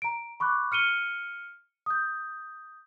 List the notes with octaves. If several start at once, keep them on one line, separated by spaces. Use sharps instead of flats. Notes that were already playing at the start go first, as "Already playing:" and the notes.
A#5 D7
B5 C#6 D6 F#6
F6 C#7 D#7 G7
D#6 G6